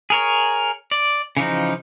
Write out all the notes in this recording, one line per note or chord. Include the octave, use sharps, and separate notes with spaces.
G#4 A#4 C#5
D5
C#3 E3 F3 D#4